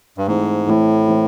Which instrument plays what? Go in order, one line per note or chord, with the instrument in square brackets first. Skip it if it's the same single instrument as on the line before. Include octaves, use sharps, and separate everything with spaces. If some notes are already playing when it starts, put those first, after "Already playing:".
[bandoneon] G2
[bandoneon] G#2 [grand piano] E3 A3 C4 E4
[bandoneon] A2 [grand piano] E3 A3 C4 E4
[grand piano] E3 A3 C4 E4